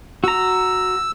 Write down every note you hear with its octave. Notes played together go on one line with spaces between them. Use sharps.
F#4 A#5 E6